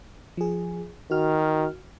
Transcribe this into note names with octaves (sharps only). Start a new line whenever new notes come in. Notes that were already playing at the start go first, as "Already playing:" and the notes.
F3 G#4
D#3 F#4 F6